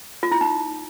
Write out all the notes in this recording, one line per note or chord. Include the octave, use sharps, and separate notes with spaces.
F4
E4
D#4